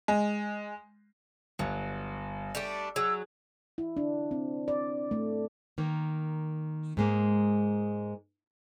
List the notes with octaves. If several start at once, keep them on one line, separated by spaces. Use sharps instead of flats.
G#3
G1 F#3
G3 A3 D4
F#3 G#4 E6
E4
D4
C4
D5
A3
D#3 A#3
G#2 G#3 A#3